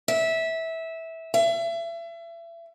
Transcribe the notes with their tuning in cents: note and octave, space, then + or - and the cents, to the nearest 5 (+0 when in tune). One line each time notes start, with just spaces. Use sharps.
E5 -15
E5 +35